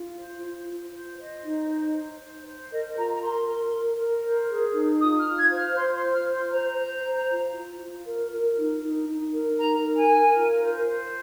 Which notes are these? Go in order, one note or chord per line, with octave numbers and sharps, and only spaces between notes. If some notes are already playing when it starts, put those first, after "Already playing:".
Already playing: F4
C5
F4
F4
C5
C5 D#5
D#4
C5
C5
C5
C5
A#4 D#5
F4 A#5
A#5
A#4 C6
A#4
A#4
A#4
C5
G#4
D#4
F4 D#6
F6
F4
G#6
C5
F6
C5 C6
C6
F4
F6
C5
C6
C5 A#5
C5
C5
F4
F4
F4
A#4
A#4
D#4
D#4
D#4
A#4
D#4 A#5
A#4
G#5
A#4
F4
C5
C5